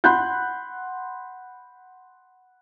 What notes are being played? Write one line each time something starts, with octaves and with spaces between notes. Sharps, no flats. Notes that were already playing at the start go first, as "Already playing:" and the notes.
F#5 B5 C6 F#6 G6